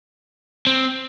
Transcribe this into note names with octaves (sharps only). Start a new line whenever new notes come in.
C4